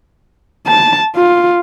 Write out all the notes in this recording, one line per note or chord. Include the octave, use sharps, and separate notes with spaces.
A5
F4